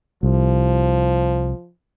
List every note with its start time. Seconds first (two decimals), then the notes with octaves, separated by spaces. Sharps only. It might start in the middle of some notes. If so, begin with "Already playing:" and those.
0.23 C2 F3